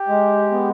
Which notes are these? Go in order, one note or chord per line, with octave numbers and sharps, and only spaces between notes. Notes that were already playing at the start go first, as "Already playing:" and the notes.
Already playing: G4
G#3
B3